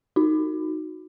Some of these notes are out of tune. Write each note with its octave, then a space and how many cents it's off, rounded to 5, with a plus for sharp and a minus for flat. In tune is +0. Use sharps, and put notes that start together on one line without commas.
D#4 +0 F#4 -10